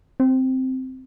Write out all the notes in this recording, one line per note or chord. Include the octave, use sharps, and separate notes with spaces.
C4